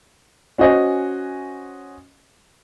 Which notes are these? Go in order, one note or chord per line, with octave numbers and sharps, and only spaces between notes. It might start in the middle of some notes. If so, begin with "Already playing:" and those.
C#4 F#4 C5 D#5 G#5